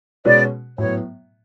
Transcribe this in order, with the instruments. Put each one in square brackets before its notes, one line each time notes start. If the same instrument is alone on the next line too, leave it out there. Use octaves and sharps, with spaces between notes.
[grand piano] B2 G#3 C#4 F#4 B4 [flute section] D5
[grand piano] A2 F#3 B3 [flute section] C#5